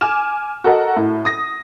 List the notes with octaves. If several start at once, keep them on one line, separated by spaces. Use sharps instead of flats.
G#5 D6 F6 E7
F#4 A4 A#4 D#5 F#5
A2
D#6 A#6